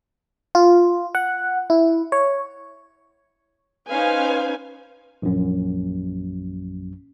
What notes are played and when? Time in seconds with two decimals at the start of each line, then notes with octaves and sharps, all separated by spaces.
0.55 F4
1.15 F#5
1.70 E4
2.12 C#5
3.88 C#4 D#4 B4 C5 F5 G#5
5.22 A#1 F#2